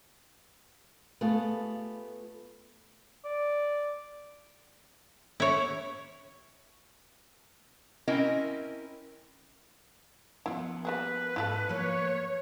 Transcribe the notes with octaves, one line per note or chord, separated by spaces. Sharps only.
A3 B3 F4 G4 G#4 B4
D5
E4 C#5
C4 C#4 E4 A#4 D#5
F3 B3 E4 F4
G3 A#3 G#4 B4
G#2 E4 F4 A4
F3 A#3 C#5